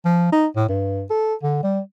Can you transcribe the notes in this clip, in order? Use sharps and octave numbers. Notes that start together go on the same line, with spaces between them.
F3
D#4
A2
G2
A4
D3
G3